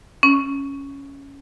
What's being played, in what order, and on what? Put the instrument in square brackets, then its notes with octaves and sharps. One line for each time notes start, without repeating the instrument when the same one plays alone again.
[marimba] C#4